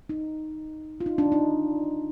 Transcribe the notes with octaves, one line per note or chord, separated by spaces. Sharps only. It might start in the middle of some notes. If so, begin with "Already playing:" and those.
D#4
F4
D#4
D4
D#4